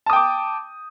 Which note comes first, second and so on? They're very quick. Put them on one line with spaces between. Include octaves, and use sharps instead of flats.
A5 D#6 G5 D6